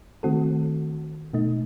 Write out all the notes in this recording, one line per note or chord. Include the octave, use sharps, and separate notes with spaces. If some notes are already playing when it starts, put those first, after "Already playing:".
D#3 A3 C4 F#4 A4
B2 A3 D#4